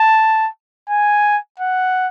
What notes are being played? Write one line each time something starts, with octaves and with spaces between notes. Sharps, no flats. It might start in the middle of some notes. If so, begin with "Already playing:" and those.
Already playing: A5
G#5
F#5